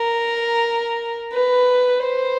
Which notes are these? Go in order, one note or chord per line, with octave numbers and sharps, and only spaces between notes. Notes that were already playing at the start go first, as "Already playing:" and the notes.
Already playing: A#4
B4
C5